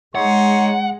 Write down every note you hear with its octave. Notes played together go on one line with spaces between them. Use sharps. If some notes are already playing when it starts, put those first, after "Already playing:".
G#3 D#4 C#5 F#5 C6